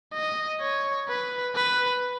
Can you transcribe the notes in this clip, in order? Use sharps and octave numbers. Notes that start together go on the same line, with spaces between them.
D#5
C#5
B4
B4